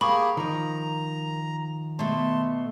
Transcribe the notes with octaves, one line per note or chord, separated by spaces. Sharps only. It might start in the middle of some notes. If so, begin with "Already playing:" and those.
A#3 G4 G#4 A#4 B5 C#6
D#3 F3 A#5
B2 A3 A5 C6